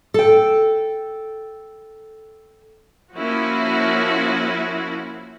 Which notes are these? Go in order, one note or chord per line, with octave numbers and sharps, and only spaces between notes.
A4 G5
F3 A#3 C#4 E4 F#4